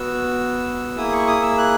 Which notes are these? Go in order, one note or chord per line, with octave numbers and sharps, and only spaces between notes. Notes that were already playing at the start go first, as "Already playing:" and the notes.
Already playing: B3 F#4 E6
A#3 E4 G#4 D#6
C#6
D#6
E6
F#6